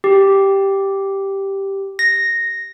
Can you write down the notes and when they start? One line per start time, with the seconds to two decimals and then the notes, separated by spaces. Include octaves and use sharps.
0.04 G4
1.99 A#6